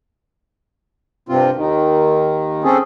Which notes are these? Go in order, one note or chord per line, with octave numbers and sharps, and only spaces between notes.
G2 C3 C4 F4
D#2 D#3
C4 C#4 G#4 A4